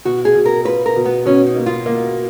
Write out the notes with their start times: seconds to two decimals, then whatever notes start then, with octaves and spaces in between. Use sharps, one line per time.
0.05 B2 F#4
0.25 G#4
0.35 B2
0.45 A#4
0.65 F4 B4
0.86 A#4
0.96 B2
1.05 B3
1.26 B2 C#4
1.46 D#4
1.56 A#3
1.66 F4
1.86 A#3